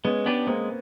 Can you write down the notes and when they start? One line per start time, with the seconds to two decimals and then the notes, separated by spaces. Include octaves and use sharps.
0.04 G#3 B3 C#4
0.26 B3 D4 G4 B4
0.47 G#3 A#3 C4